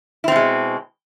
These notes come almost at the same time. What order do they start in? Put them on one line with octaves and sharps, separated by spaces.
E4 C4 B2 G#3